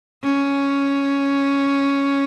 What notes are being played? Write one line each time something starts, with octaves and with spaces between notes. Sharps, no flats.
C#4